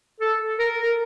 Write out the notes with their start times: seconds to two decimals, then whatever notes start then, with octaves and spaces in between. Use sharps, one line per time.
0.20 A4
0.59 A#4